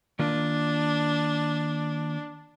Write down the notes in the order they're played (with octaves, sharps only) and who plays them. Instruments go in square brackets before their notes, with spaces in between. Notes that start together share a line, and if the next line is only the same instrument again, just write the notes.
[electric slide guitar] D#3 A#3 F4 [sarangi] D4